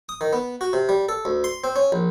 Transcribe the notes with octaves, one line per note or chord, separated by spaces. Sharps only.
D#6
D#3
B3
F#4
C3
G3
A4
D2
C6
C4
C#4
A#1